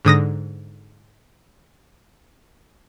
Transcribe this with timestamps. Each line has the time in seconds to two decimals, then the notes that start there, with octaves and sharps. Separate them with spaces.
0.05 G#2 D3 D#6 A#6